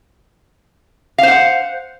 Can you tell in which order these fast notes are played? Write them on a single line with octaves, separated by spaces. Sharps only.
F5 C5 F#5